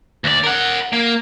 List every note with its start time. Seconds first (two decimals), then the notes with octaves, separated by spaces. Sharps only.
0.24 D2 D5
0.44 A#4 F#5
0.93 A#3